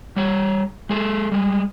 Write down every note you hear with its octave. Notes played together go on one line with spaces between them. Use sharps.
G3 C#5
G#3 G#4 A4
G3 G#3